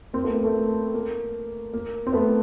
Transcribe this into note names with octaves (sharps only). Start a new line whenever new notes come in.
A#3 C4
A3 B3
A#3
A3
A#3
A#3
C4
A3 B3